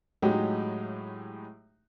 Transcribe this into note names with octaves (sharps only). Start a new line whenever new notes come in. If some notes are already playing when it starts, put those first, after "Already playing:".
A2 F#3 G#3 D#4 G4